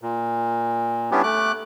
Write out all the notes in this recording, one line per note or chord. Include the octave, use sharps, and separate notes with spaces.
A#2
G3 B3 C#4 D4 E4 G4
A3 D6 F#6